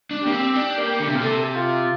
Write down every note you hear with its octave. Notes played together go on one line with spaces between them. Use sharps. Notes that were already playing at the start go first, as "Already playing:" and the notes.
D4
G4
A#3
C4
D4
A#3
D3
C3
A#2 A#4
C3 A4
G4
F4